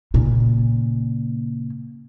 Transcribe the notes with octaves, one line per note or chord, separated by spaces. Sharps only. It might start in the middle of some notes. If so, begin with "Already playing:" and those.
A#2 C#3